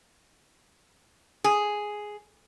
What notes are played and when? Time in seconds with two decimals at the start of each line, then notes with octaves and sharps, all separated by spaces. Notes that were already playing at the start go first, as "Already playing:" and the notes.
1.44 G#4